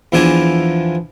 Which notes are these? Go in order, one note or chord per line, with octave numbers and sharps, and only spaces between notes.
E2 E3 F3 D4 G#5